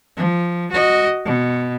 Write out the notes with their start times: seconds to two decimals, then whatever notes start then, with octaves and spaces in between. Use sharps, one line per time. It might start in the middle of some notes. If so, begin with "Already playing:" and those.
0.17 F3
0.71 F#4 D#5
1.25 B2